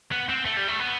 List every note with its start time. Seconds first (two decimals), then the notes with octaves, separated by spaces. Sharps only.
0.12 B3
0.29 C4
0.45 A3
0.57 G3
0.68 A3
0.79 B3